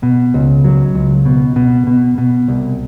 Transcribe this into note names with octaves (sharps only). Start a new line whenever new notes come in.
B2
C#2
F#3
C#2
B2
B2
B2
B2
C2